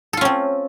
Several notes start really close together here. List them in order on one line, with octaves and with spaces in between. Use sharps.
A4 F4 C#4 C4